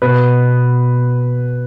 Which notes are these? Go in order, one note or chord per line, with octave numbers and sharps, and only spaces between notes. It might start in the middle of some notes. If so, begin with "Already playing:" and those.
B2 B4